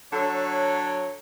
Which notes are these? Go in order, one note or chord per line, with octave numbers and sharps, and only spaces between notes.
D3 F#3 A4 C#5